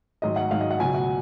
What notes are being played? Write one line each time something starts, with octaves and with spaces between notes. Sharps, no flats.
G#2 D#3 F#3 D#5
F#5
G#2 D#3 F#3 F5
D#5
F#5
C#2 B2 F#3 G#5
F#5